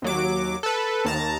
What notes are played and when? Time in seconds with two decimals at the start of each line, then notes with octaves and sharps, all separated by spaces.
0.02 D#2 F#3 D6
0.63 A4 B4
1.05 D#2 A5 A#5